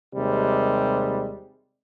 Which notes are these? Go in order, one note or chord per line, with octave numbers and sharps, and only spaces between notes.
D#2 C3 G3 G#3